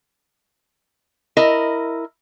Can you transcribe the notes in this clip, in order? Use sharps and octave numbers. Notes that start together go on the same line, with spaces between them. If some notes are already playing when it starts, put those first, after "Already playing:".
E4 A#4 D#5